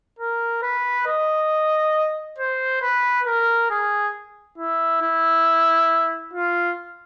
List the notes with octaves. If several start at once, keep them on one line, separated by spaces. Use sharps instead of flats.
A#4
B4
D#5
C5
B4
A#4
G#4
E4
E4
F4